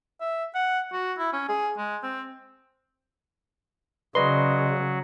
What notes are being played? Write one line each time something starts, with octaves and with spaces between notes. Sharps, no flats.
E5
F#5
F#4
E4
C#4
G#4
G#3
C4
C#3 F#3 F#4 B4 D5 D#5 B5 C6